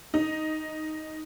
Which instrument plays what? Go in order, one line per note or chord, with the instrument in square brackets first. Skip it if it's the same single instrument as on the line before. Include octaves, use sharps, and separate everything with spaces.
[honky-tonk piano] D#4